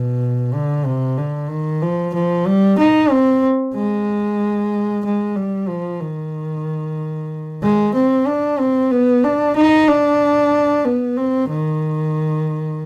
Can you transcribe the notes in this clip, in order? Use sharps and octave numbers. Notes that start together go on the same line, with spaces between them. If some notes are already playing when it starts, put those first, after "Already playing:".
Already playing: B2
D3
C3
D3
D#3
F3
F3
G3
D#4
C4
G#3
G#3
G3
F3
D#3
G#3
C4
D4
C4
B3
D4
D#4
D4
B3
C4
D#3